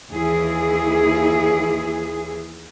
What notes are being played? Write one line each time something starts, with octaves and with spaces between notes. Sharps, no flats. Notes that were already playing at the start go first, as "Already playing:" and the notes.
D#2 E3 E4 G#4